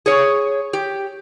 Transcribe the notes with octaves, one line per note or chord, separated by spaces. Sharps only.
G#4 C#5
G4